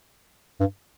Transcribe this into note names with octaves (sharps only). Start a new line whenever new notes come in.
G2